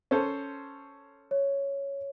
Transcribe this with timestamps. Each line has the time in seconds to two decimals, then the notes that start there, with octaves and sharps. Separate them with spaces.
0.11 C#4 A4 C5
1.31 C#5